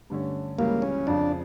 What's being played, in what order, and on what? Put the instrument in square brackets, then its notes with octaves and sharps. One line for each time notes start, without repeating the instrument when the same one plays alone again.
[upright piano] G2 D3 A3 C#4
[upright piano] C#2 C#3 E3 G3 C#4 [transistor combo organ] A#3
[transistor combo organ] C#4
[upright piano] F2 C#3 F3 [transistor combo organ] D4